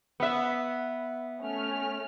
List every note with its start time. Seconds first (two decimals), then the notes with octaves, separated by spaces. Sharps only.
0.20 B3 E5
1.41 A3 C#4 F6